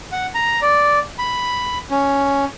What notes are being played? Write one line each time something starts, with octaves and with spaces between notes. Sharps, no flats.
F#5
A#5
D5
B5
C#4